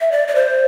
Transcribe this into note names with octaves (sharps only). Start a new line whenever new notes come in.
E5
D5
D5
C5